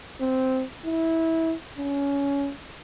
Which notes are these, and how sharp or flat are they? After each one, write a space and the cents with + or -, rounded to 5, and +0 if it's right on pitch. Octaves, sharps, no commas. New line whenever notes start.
C4 -5
E4 -20
C#4 +20